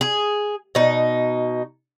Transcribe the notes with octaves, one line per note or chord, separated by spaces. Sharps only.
G#4
B2 D#4